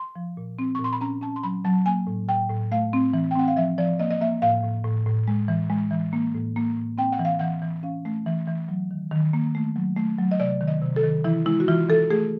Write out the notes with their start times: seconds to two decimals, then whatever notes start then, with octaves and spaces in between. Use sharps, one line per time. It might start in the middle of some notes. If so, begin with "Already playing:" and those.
Already playing: C6
0.16 F3
0.37 A#2
0.59 C4
0.75 C#6
0.79 A#2
0.84 C6
0.92 B5
1.01 C#4 A#5
1.21 C#4 A5
1.36 C6
1.43 F#3 B5
1.65 F#3 A5
1.86 A#3 G#5
2.07 A2
2.29 A2 G5
2.49 A2
2.72 A3 F5
2.93 C4
3.14 E3
3.31 G5
3.35 C4 F#5
3.48 F5
3.56 F3 E5
3.78 F3 D5
3.99 A#3 D#5
4.11 D#5
4.21 A#3 E5
4.42 A2 F5
4.63 A2
4.84 A2
5.06 A2
5.28 G#3
5.48 E3
5.70 G#3
5.91 E3
6.13 A#3
6.35 A2
6.56 A#3
6.76 A2
6.98 C4 G5
7.12 F#5
7.19 E3
7.25 F5
7.39 E3 F#5
7.62 E3
7.83 C#4 F5
8.05 A3
8.26 E3
8.47 E3
8.69 F#3
8.91 D#3
9.12 D#3
9.33 A#3
9.55 A3
9.76 F#3
9.96 A3
10.19 F#3
10.31 D#5
10.40 C3 D5
10.61 D#3
10.68 D#5
10.82 C3
10.96 A4
11.03 D#3
11.24 E3 E4
11.46 G#3 E4
11.60 F#4
11.68 E3 F4
11.89 E3 A4
12.10 A3 G#4